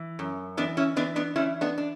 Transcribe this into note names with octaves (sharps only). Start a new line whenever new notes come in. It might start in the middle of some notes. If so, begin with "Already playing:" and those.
Already playing: E3
F#2
E3 B3 D4
C#4 E4
E3 B3 D4
B3 D4
E3 C#4 E4
B3 D4
D4